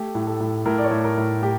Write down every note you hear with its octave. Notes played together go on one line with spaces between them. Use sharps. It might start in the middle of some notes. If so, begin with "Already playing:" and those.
Already playing: A3 G4
A2
A4
A2
A2 A#4
D5
C#5
A2
A#4
A2
A2 G4